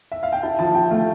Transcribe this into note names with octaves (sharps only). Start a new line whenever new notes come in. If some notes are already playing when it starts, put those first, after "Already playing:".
E5
F5
G5
E4 A5
F3 A5
E4 G5
A3 F5